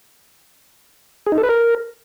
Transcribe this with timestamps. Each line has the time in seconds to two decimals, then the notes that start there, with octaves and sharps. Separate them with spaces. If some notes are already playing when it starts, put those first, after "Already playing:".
1.26 G#4
1.32 D#4
1.38 A4
1.43 B4
1.49 A#4